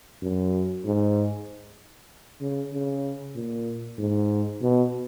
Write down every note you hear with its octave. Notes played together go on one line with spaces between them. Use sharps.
F#2
G#2
C#3
C#3
A#2
G#2
B2